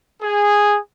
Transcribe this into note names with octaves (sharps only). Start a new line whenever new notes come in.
G#4